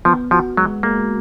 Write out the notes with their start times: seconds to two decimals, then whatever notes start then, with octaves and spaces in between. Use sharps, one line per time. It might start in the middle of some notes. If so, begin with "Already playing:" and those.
0.05 F3 B3
0.31 F3 F#4
0.57 F#3 G#3
0.83 G#3 A#3